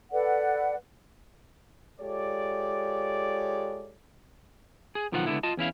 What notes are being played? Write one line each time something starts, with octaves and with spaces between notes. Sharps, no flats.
A4 B4 D5 F#5
G#3 F4 G4 A4 C#5 D5
G#4
B1 D#3 F3 F4 D#5 F#5
C#2 G#2 D3 B3 E4
F4 D#5 A5
E2 C#4 E4 F5